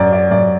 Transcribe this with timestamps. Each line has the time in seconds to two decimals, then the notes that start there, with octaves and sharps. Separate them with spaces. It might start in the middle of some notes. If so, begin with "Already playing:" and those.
Already playing: F#2 D5
0.12 D5
0.31 F#2 D5